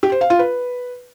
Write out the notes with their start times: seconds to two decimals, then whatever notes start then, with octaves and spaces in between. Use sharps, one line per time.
0.03 G4
0.12 C5
0.21 F5
0.30 F4
0.39 B4